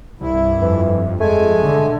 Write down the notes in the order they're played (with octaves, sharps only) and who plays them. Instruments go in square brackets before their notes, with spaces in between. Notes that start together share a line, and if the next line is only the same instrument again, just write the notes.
[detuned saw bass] C2 [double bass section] G2 [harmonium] E4
[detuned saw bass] F2 [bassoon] E3
[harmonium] G#3 G#5 [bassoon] A3
[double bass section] D3